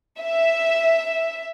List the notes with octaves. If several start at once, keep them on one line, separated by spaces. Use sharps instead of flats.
E5